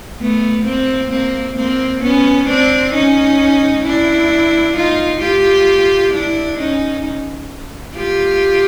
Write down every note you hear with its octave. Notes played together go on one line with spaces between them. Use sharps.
A3 B3
A#3 C4
A#3 C4
A#3 C4
B3 C#4
C4 D4
C#4 D#4
D4 E4
D#4 F4
F4 G4
D4 E4
C#4 D#4
F4 G4